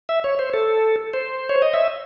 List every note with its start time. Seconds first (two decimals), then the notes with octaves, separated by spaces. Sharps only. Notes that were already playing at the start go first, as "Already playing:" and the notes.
0.09 E5
0.24 C#5
0.39 C5
0.54 A4
1.14 C5
1.49 C#5
1.62 D#5
1.74 E5